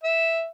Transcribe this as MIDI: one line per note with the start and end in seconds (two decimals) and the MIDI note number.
0.03 0.48 76